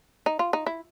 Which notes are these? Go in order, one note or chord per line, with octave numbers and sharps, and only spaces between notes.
D#4
F4
D#4
E4